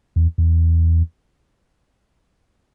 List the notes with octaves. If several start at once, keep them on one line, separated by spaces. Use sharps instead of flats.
E2
E2